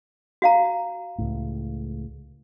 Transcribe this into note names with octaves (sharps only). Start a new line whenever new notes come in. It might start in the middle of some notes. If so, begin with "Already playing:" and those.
F#4 F5 A#5
C#2 A2